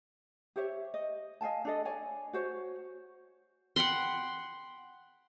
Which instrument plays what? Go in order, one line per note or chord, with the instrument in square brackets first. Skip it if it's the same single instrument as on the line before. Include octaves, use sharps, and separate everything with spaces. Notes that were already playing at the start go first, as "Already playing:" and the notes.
[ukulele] G4 C5 C#5 E5
D#5
D#5 F5 G#5 A5
D4 A4 D#5
C#5 D5 G#5
F#4 C5 C#5
[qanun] F#5 G5 B5 C6